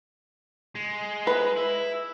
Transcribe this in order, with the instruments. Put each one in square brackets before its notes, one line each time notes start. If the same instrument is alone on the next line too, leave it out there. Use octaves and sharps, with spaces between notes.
[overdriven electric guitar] G#3
[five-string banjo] B4
[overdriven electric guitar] E4